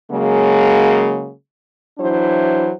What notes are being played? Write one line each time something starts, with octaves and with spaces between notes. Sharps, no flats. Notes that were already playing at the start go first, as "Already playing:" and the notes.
C#3 F#3 G#3 A#3 G#4
E3 F#3 D4 E4 C5